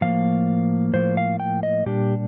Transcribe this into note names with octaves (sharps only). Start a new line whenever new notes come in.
A2 F3 A#3 F5
A2 F3 A#3 C5
F5
G5
D#5
A#2 G3 D4 G4